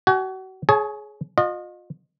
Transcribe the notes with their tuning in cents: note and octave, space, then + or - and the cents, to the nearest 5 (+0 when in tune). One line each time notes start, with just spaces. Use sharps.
F#4 +35 G#5 +20
G#4 +20 C#5 +0 A5 -30
F4 +35 D#5 -25